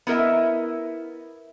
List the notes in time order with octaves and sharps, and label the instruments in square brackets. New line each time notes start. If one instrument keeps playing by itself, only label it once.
[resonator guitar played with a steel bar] B3 E4 A#4 D#5 E5